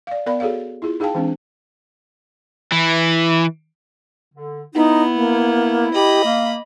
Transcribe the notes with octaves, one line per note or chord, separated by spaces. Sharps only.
D5 F5
B3 A#4 D5 F5 B5
F#4 G#4 A4 C#5 F5
E4 F4 G#4
D#4 G#4 F5 G5 A5
E3 G#3 C4 D4
E3
D3
B3 D#4 E4
A#3
G4 D#5 B5
A#3 F5